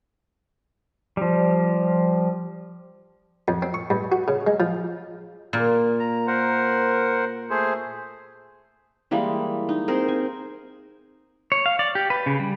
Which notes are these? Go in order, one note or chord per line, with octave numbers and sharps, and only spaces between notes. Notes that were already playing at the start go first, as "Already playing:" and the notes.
F3 G3
F2
C4
C#6
G2
F#4
C#3
G#3
F3
A#2
A#5
A#4 C5 F#5
A3 G#4 C5
E3 G3 G#3 A#3
D#4
C4 G#4 A#4 C5
G#5
C#5
F5
D5
G4
B4
C#3
G3